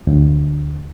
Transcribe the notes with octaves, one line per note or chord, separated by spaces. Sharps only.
D2